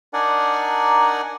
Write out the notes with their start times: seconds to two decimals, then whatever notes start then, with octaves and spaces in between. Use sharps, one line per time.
0.13 D4 D#4 A#4 D5 F#5 G#5